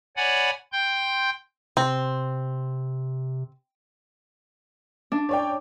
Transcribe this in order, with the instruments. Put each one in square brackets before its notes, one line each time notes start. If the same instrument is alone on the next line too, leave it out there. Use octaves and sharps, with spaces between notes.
[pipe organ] C#5 D5 F#5 G#5 B5
G5 C6 G6
[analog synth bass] C3 [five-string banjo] C4
[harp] D4
[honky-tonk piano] C#5 D5 G5